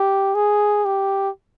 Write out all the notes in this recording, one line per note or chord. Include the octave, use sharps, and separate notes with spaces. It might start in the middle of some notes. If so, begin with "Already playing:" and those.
Already playing: G4
G#4
G4